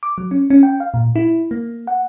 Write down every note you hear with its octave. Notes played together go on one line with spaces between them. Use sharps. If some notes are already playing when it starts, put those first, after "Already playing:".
D6
F#3
C#4
C#4
G5
F5
A#2
E4
A#3
F#5